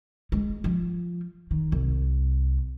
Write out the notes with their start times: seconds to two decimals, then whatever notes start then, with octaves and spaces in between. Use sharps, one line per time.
0.32 G#3
0.64 F3
1.51 D#3
1.72 C2